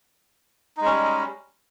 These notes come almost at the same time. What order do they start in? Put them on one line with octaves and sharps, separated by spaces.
D#4 G#3 C#4 G3